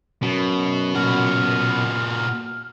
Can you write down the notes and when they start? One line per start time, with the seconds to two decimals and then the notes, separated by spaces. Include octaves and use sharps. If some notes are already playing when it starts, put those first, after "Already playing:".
0.22 F#2 B2
0.95 A#2 F#4 F6